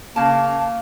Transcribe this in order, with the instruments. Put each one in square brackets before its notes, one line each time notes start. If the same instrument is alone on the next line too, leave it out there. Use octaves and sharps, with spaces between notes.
[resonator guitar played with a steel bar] C#3 A5 [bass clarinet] A#3